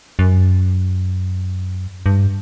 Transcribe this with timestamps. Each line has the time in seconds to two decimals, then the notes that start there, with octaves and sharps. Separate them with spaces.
0.19 F#2
2.06 G2